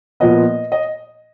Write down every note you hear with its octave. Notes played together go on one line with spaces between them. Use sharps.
A#2 F3 B3 D#5
D#5